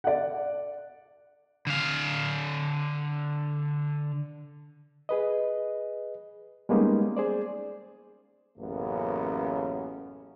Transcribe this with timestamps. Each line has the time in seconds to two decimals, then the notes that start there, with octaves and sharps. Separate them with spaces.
0.04 D5 F#5
1.67 D3 F5
5.09 G#4 B4 D#5
6.69 G3 G#3 A#3 B3 C#4 D#4
7.17 G#4 C5 D5
8.58 A1 F#2 C#3 A#3 B3